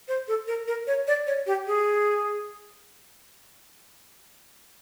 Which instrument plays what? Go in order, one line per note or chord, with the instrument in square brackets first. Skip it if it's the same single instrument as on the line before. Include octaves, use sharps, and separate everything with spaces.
[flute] C5
A4
A#4
A#4
C#5
D5
C#5
G4
G#4